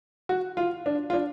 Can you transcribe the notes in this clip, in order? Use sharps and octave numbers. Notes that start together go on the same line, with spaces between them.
F#4
F4
D4
F4
D4